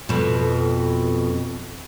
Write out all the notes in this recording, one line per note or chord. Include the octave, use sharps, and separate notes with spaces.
F2 B2